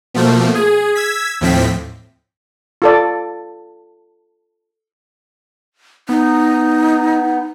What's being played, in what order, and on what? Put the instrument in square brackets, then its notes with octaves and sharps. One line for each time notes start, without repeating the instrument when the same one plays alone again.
[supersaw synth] B2 F3 A3 A#3
G#4
E6 G#6 B6
D#2 A2 F3 C4 B6
[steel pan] F4 A4 D5
[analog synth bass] B3 [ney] D#4